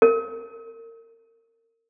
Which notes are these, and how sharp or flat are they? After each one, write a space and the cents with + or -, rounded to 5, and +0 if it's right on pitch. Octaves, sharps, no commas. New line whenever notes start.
A#4 -35